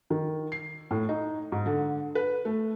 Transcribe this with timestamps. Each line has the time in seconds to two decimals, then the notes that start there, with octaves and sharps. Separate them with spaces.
0.10 D#3
0.52 C7
0.91 A2
1.09 D#4
1.52 G#2
1.66 D3
2.15 B4
2.45 A3